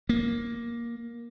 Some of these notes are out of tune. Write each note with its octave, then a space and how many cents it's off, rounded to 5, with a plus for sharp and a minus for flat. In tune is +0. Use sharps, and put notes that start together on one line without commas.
A#3 +10